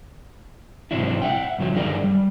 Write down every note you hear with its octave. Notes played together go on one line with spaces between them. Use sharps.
G#2 C3 E3 F#3 D4 E4
E5 F#5 G5
G2 C#3 F3 F#3
G2 D3 D#3 G#4 A#4 D5
G3